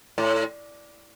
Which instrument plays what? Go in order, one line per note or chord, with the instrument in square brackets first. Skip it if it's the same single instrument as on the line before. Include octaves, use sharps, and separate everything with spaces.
[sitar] A2